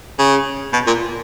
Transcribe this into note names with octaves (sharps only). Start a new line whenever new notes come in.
C#3
B2
A#2